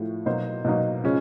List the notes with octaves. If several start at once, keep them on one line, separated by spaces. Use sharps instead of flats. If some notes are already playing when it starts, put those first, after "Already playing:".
Already playing: A2 F3 A3
B2 F#3 A#3 D#4 C5
B2 F#3 A#3 D#4
C#3 F3 G#3 C#4